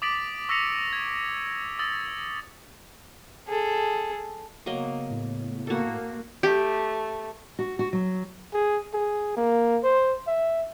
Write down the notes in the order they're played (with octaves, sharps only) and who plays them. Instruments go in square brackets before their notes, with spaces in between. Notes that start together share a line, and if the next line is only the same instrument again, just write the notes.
[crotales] D6 D#6 A6 B6 D7 F#7
C#6 E6 A#6 B6 C#7 F7
G#6
D#6 E6 A6
[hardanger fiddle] G#4 A4
[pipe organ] C#3 B3 [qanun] F#3 A#3 D#5
[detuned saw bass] A2
[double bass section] A#3 [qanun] F#4 A4
[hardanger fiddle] A3 [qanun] G4
[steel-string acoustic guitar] F#4
F#4
F#3
[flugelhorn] G#4
G#4
A#3
C5
E5